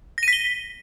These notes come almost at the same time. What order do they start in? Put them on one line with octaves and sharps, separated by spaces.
A#6 D#7 B6 G7